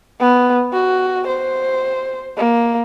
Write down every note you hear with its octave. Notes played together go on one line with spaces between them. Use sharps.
B3
F#4
C5
A#3